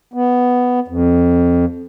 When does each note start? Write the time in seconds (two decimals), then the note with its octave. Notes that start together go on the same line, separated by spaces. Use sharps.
0.14 B3
0.88 F2